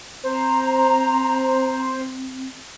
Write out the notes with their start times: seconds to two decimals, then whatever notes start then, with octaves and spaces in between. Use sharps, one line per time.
0.24 C4 C5 A#5